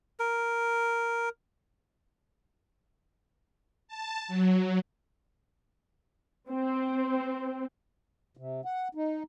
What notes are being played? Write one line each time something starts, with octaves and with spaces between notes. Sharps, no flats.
A#4
A5
F#3
C4
C3
F#5
D#4